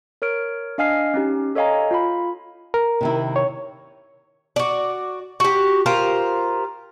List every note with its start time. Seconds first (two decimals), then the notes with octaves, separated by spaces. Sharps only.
0.22 A#4 C#5 F6 D7
0.78 D4 D#5 F5 G#5 F6 C7
1.14 C#4 D#4 G4
1.55 A4 C#5 D#5 F5 G#5 A#5
1.91 F4 F5 B5
2.74 A#4
3.01 C3 D#3 E4
3.36 C#5
4.56 F#4 D5
5.40 F#4 G4
5.86 F4 G4 A#4 C5